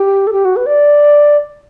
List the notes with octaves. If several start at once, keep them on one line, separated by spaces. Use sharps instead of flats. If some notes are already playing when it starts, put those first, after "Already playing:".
Already playing: G4
A4
G4
F#4
B4
D5